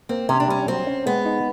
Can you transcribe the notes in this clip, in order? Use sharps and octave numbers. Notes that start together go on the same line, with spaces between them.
A#3 C4
C3 C#4
D4
G3 C#4
F#3 C4
C#4
G#3 B3
D#4